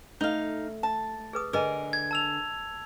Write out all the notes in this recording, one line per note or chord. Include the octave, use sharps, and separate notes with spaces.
A3 D#4 F5
A5
G#4 B4 D#6
D3 G#4 A#4 B4 D5 D#5 G#5
G#6
A5 E6 F7